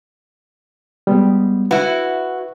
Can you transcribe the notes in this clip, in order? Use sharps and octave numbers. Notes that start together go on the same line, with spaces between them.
G3 G#3 B3
E4 F#4 B4